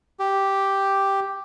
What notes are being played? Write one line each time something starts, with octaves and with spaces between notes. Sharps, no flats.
G4